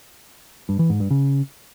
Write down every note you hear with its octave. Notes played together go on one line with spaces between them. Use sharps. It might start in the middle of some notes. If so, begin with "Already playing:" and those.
G2
E3
G#2
G2
C#3